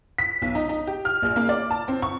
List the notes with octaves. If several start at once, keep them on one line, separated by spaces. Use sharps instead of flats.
B6
B1
D#4
D#4
G4
F6
A#1
A#3
D5
A5
C4
C#6